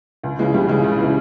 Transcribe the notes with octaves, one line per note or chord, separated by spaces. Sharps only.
C#2
C#3 E3 G#3
C#2 G3
C#3 E3 G#3
C#2
C#3 E3